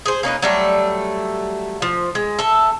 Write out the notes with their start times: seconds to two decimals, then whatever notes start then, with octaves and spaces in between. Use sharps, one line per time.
0.06 G#4 C5
0.23 A#3 C#4 D#4 B4
0.42 F#3 G3 A3
1.82 F3
2.15 G#3
2.39 A4 E5